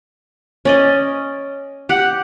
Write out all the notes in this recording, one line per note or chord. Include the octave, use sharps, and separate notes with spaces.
C#4 D5 D#5
G4 F#5